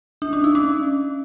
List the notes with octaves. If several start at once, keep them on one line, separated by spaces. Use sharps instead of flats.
D4
C#4
D#4
C#4